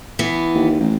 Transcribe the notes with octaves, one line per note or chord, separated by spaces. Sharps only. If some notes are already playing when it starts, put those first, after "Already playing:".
E3 B3
D#2
A1